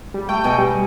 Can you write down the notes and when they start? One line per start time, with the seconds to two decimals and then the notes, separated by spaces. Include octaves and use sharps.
0.14 G3
0.29 A3 G5
0.44 B2 G#5 C#6
0.58 G3